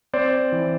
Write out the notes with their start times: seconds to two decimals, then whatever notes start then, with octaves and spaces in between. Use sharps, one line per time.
0.13 C4 C5 D5
0.52 E3